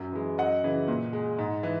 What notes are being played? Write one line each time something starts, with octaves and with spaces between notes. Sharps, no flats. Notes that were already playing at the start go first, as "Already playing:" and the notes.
Already playing: F#2
E3 G#3
F#2 D#5 F#5
C#3 E3
A#2
G#3
G#2
E3